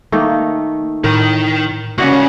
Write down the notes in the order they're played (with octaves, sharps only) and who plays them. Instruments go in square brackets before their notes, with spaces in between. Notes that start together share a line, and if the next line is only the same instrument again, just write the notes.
[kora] D#3 A3 D#4 [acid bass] A#3
[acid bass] A2 [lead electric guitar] D#3 [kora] A#4
[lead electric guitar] C2 C#3 [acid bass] A#3 [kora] F#4 F#5